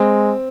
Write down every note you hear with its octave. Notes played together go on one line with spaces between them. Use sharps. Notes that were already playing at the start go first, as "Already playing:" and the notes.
Already playing: G#3 C4